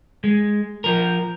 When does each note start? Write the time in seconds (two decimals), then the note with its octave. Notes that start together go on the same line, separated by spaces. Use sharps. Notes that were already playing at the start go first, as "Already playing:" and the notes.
0.24 G#3
0.84 F3 A#4